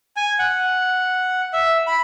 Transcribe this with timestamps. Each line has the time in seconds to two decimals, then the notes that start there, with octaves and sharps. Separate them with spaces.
0.16 G#5
0.39 F#5
1.53 E5
1.87 B5